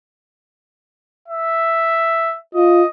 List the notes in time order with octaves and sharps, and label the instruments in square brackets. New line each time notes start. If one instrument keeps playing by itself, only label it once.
[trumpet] E5
[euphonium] F4 [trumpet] D#5